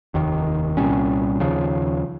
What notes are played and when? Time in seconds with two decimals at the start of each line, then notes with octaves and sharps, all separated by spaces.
0.14 F1 D#2 D#3
0.77 C2 A#2 G3 C#4
1.40 D#2 C#3 F3